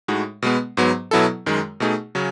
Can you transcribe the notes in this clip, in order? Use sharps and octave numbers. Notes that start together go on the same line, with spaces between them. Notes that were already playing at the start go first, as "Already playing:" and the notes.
A2 G#3 D#4 F#4
B2 G#3 B3
G#2 F#3 B3
B2 F#3 B3 E4 A4
F#2 D#3 G#3
B2 A3 D#4 G#4
C#3 F#3 C#4